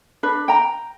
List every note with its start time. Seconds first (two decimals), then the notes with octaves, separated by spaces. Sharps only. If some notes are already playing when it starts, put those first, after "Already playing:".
0.23 D4 B4
0.48 G5 A#5